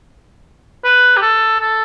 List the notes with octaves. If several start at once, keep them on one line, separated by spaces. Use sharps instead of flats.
B4
G4
A4
A4